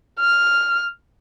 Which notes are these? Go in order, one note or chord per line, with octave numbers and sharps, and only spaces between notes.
F6